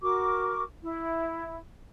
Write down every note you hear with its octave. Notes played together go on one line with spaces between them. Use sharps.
F#4 A#4 C#6 D6
E4